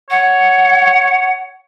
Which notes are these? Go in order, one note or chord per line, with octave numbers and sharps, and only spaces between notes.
C#5 F#5